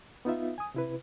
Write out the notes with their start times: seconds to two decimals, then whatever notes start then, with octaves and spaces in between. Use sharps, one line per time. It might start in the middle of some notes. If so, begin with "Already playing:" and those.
0.25 B3 D#4 F4 E5
0.58 G#5 D#6
0.74 C3 E4 B4